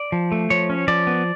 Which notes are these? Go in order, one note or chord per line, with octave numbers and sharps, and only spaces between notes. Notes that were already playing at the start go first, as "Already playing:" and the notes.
Already playing: D5
F3
A3
F3 C#5
C#4
F3 D5
B3